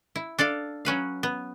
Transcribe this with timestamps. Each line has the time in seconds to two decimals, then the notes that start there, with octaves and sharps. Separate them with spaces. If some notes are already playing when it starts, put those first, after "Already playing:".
0.16 E4
0.39 D4 A4 D5 F5
0.85 F#3 C#4 B4 F5
1.23 B3